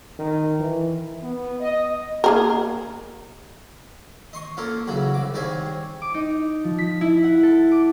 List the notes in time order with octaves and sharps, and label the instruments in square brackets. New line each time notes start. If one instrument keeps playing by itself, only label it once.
[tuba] D#3
E3
[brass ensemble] B3
D#5
[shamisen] A#3 G#4 A#4
[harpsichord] D#5 C6 C#6
A#3 C#4 F4 A4 A#4
C#3 E3 F#3 F#4
C2 D6
D#3 G3 C4 G4 G#4 C#5
[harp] D6
D#4
F3
B6
E4
F#5
A4
D6